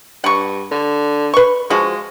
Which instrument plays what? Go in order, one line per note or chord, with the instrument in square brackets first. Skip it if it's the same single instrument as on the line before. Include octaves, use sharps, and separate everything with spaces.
[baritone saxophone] G2 [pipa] F#5 C#6
[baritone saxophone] D3
[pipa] B4 C#6
[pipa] F3 F#4 [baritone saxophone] G#3